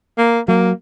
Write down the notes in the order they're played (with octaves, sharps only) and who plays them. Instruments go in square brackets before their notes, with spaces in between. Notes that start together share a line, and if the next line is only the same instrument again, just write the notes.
[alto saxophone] A#3
[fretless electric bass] F#3 [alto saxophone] A#3